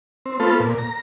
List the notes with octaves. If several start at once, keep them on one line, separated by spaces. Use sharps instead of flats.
C4
A3 B3 C4 F4 A4
A#2
A#5